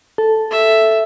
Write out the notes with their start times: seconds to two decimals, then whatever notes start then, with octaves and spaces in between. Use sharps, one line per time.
0.18 A4
0.51 E5